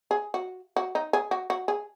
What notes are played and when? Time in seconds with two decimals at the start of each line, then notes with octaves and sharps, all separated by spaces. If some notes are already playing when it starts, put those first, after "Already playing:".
0.11 G#4
0.34 F#4
0.76 F#4
0.95 D#4
1.13 G#4
1.31 F#4
1.50 F#4
1.68 G#4